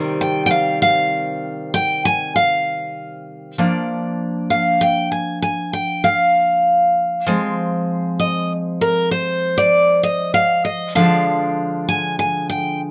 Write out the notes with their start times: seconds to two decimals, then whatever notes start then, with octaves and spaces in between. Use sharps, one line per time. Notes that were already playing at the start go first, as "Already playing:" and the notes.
Already playing: C3 D#3 G3 C4
0.21 G5
0.46 G5
0.51 F5
0.82 F5
1.74 G5
2.05 G#5
2.36 F5
3.58 F3 A#3 D4
4.50 F5
4.81 G5
5.12 G#5
5.42 G#5
5.73 G5
6.04 F5
7.27 F3 G#3 C4
8.20 D#5
8.81 A#4
9.11 C5
9.58 D5
10.03 D#5
10.34 F5
10.65 D#5
10.95 D3 F3 G#3 D4 F5
11.89 G#5
12.19 G#5
12.50 G5